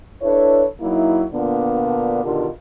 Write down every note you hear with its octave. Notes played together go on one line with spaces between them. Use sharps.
D4 E4 A4 B4 C#5
F#3 A#3 D#4 E4
A#2 D3 A#3 B3 D4 F4
B2 D3 D#3 F4 G4 A#4